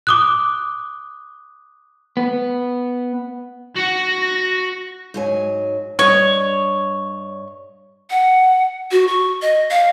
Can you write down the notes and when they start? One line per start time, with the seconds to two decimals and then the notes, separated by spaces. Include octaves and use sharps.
0.07 D6 D#6 F#6
2.17 B3
3.76 F#4 F#5 A#6
5.14 G#2 F#3 G#5
5.99 G2 C#5 D#5
8.10 F#5
8.91 F#4
9.08 C#6
9.42 D#5
9.71 F5